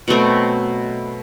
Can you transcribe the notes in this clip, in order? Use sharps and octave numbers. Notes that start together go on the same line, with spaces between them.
B2 F#3 A3 C4